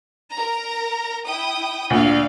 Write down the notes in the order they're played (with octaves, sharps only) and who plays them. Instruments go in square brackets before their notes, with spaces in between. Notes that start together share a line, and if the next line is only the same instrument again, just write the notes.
[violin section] A#4 A#5
E4 G5 D#6
[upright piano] D2 A#2 [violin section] D5 F5